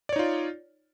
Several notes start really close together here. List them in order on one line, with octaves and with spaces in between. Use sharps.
D5 C#5 D#4 F4